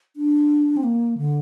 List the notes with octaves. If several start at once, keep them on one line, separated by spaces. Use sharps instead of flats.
D4
C4
A#3
D3